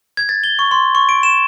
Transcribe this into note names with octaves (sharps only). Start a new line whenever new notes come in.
G#6
A6
G7
C#6
C6
C#6
D7
E7